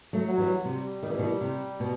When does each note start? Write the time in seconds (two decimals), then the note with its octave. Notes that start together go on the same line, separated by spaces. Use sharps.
0.13 F#3 A3
0.26 F#3
0.38 E3 G3
0.64 C3 G3
1.03 D#3
1.10 E3
1.19 B2 D#3
1.41 C3
1.80 B2